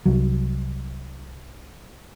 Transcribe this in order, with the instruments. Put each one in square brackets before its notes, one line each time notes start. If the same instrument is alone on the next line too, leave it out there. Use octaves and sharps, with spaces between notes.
[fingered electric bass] C2 F#3